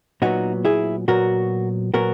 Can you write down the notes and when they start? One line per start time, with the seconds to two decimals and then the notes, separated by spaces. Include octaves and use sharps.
0.22 A#2 F#3 B3 D#4 F#4
0.65 E4 G#4
1.08 A#2 F#3 B3 F#4 A#4
1.94 A#2 F#3 B3 F#4 A#4